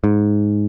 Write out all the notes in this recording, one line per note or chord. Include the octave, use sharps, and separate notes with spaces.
G#2